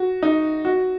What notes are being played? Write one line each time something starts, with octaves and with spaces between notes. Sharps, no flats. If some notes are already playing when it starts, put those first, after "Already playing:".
Already playing: F#4
D#4
F#4